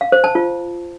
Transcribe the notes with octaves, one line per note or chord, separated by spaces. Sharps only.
F5
C5
A5
F4